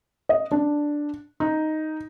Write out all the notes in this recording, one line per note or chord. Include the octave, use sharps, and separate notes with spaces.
D#5
D4
D#4